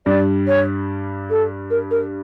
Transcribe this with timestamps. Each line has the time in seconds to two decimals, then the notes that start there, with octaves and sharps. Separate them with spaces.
0.06 G2 G3 D5
0.47 C#5
1.30 A4
1.70 A#4
1.91 A#4